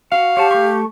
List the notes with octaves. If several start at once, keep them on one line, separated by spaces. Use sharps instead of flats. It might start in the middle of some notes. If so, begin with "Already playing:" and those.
F#4 F5
G4 C#5 F#5 A5
A3 C#6